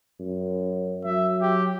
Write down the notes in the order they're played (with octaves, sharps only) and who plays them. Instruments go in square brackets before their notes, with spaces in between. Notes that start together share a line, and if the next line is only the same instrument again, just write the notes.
[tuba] F#2
[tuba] F#3 [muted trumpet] E5
[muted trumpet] G4